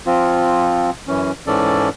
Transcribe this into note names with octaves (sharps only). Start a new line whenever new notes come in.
F3 C4 F4
F#2 E3 C#4
G#2 E3 C#4 A4 D5